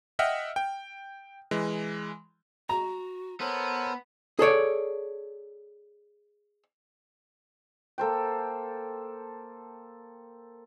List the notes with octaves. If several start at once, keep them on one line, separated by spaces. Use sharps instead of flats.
D#5 E5 F#5 G5 F6
G5
E3 G#3
F#4 A#5
B3 A4 A#4 C5 C#5
G#4 A4 C#5 D5
A#3 A4 C5 G5